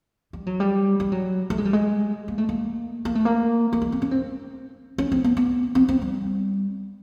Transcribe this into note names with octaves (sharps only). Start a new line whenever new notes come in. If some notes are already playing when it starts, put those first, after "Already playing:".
G3
F#3
G3
G3
F#3
A3
G#3
G3
G#3
A#3
A3
A#3
A#3
A3
A#3
A3
G#3
C4
C#4
C4
C#4
C4
B3
B3
C4
C4
G3